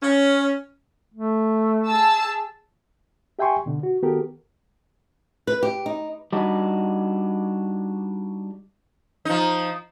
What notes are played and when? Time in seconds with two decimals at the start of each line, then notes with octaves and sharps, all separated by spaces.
0.02 C#4
1.14 A3
1.87 G#4 A5 E6
3.39 G4 E5 G5 G#5 C6 C#6
3.66 B2 D3
3.83 F#4
4.02 D#3 B3 F#4 G4 A4 A#4
5.47 B4
5.63 G4
5.86 D#4
6.33 G3 D4 D#4 F#4
9.25 F3 D#4